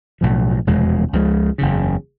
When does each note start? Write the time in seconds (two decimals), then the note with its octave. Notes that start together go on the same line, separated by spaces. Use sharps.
0.21 B1 A2 F3
0.67 F1 E2 B2 G#3
1.13 C#2 C#3 F3 G#3
1.58 F#1 E2 C#3